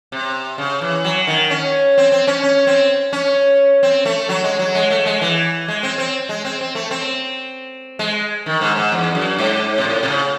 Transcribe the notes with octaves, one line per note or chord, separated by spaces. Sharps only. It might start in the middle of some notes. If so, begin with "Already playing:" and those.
C3
C#3
E3
F#3
D#3
C#4
C4
C4
C#4
C#4
C4
C#4
C4
A3
F#3
G#3
F#3
G#3
A3
G#3
E3
G#3
C4
C4
G#3
C4
C4
A3
C4
G#3
D#3
G#2
G#2
E2
F#2
G#2
C3
A2
C3
C#3